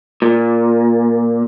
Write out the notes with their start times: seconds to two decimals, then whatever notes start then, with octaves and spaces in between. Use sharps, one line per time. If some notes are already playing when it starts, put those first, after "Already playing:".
0.22 A#2